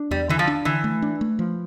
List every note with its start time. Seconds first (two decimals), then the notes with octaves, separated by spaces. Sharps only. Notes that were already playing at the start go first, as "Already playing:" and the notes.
Already playing: D4
0.11 E2 G3
0.29 D3 E3
0.39 F3
0.48 D4
0.65 D3 E3
0.84 A3
1.02 D4
1.21 A3
1.39 F3